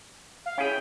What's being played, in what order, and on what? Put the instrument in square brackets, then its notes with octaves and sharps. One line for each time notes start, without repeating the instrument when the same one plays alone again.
[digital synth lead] F5
[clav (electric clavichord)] C#4 E4 G#4 [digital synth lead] G5